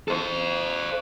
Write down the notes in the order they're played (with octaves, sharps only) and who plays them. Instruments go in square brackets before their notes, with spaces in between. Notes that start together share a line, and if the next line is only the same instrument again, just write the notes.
[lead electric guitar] A4 C5